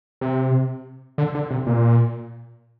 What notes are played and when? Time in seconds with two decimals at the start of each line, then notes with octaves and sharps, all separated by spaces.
0.21 C3
1.18 D3
1.34 D3
1.50 C3
1.67 A#2